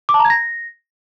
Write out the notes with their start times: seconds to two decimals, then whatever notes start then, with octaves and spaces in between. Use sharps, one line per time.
0.09 D6
0.14 A5
0.19 A#5
0.25 G#6
0.30 A#6